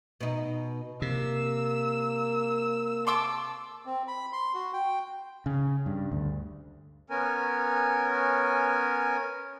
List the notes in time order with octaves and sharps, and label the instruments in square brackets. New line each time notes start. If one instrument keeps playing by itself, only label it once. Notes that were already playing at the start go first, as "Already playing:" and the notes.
[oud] B2 D#4
[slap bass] C3 [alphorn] A#3 [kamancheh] E6
[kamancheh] A5 [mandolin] C6 D6 E6
[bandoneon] C4
B5
C6
F#4
G5
[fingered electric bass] C#3
G2
D2
[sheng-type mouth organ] B3 C#4 A#4 G#5